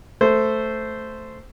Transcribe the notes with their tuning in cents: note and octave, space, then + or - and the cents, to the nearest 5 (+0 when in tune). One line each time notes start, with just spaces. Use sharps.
A3 +0 C5 -10